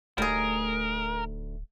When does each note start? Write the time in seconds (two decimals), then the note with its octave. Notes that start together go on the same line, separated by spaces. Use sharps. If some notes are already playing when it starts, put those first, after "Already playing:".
0.18 D1 D2 G3 A3 D#4 G#4 A#4